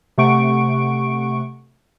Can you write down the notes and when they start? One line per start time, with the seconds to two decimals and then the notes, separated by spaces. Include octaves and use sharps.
0.18 C3 A3 F#5 C#6 D7